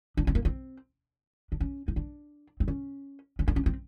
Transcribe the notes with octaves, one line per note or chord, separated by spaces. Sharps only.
D4
C4
A#3
C4
D4
C#4
D#4
D4
C4
C#4
C#4
D4
C#4
C4